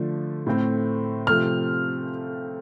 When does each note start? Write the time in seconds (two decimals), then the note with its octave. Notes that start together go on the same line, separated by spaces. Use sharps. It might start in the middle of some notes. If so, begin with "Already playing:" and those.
Already playing: D3 F3 A3
0.47 A2 A3 C4
1.27 C3 F3 A3 C4 F6